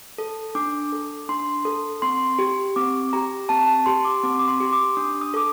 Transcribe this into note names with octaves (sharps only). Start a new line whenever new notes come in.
A4
D4 D6
A4
D4 C6
A4
C4 C6
G4
C4 D6
G4 A#5
C4 A5
A5
G4 C6
D6
C4 D6
D6
C6
G4
D6
D4 D#6
D#6
A4 D6